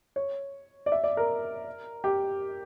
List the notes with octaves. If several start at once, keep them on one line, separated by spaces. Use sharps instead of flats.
C#5
D5
E5
D5
A#4
G4